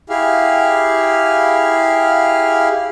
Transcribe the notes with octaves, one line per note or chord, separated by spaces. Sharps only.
E4 G4 G#4 F5